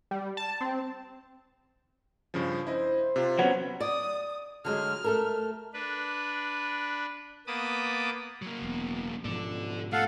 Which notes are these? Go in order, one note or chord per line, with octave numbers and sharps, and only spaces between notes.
G3
A5
C4
G2 C#3 F3
E4 C5 D#5
C3 F4
F#3 B3 C#4
D5 D#6
D3 F#3 G#3 F6
A3 A4 A#4
D4 B4
A#3 B3 A5 B5 D6 D#6
F#3 A#3
E1 B3
G#2 B2 F3 A4 D5
A3 A4 F5 F#5